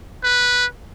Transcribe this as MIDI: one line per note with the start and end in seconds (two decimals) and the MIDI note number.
0.24 0.66 71